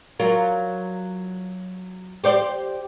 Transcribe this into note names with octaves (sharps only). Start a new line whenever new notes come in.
F#3 F4 A#4
G4 C5 D5